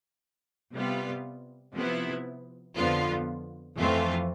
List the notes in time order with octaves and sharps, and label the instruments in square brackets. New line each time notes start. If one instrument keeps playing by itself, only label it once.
[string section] C3 G3 B3 F4
C3 F3 B3 E4
F2 D3 F3 B3 F4
F2 E3 A3 C4 F4